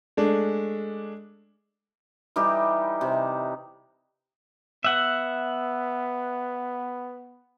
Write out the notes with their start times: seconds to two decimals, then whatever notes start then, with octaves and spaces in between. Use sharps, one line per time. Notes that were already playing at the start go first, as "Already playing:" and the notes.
0.17 G#3 A3 D4
2.36 E3 G3 D#4 G4
3.01 C3
4.84 B3 E5 F#5